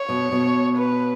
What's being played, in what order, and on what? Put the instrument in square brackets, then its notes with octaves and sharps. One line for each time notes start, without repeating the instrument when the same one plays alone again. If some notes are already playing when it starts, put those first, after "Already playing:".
Already playing: [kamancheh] C#5
[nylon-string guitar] B2
B2
[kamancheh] B4